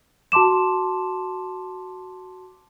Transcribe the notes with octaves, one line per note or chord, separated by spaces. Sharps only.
F#4 A5 C6 D6 E7